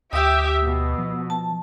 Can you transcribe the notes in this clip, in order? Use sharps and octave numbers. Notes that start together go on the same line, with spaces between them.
D2 G4 E5 D#6 E6
B2
F3
A5